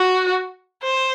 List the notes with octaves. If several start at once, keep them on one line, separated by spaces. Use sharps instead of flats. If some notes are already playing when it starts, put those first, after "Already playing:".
Already playing: F#4
C5